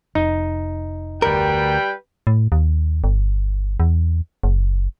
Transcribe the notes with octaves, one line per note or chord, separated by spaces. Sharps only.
F1 D#4
D2 G3 A#4 B4 G5
A2
D#2
G1
E2
F#1